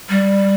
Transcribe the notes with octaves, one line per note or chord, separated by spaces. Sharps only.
G3